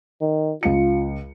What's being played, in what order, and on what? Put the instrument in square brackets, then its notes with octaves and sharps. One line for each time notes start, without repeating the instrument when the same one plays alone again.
[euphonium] D#3
[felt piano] C#2 C#7 [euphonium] F4